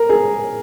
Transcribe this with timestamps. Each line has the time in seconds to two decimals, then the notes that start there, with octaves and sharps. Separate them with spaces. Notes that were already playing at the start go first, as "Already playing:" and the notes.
Already playing: A#4
0.09 G#4